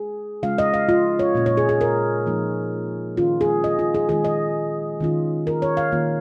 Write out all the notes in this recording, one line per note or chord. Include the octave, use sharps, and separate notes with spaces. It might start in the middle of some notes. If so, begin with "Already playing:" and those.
Already playing: G#4
C#3 G#3 C#4 F4 F5
D#5
F5
F4
C#5
A#2 A#3 C#4 F4
C#5
G#4
G#4
A#4
F3 A#3 D#4
D#3 C#4 F4
G#4
D#5
F4
G#4
D#3 G#3 F4 G#4
D#5
D#3 C#4 F4
A#4
C#5
F5
D#3 A#3 F4